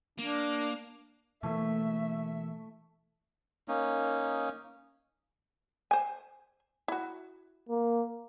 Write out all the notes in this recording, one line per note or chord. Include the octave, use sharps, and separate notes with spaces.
A#3 D4
B2 E3 A3 A#3 E5
A#3 C#4 D#4
C5 G#5
E4 F#4
A#3